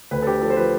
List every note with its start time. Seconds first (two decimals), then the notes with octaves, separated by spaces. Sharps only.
0.11 D2 B4
0.22 A4
0.27 D3 G4
0.42 F3 A4
0.50 C5
0.57 F3 B4